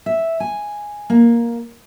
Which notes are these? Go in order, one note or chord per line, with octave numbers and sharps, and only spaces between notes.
E5
G#5
A#3